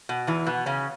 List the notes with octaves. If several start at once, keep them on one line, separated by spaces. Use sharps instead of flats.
B2
E2 E3
B2 B3
C#3 C#4